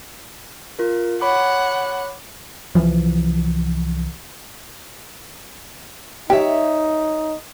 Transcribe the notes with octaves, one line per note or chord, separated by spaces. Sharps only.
F4 A#4
C#5 F#5 B5 D6
C2 C#3 E3 F3
D#4 G4 C#5 E5